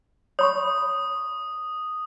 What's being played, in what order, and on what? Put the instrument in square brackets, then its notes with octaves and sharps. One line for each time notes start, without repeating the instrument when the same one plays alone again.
[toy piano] C#5 B5 C#6 [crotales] D#6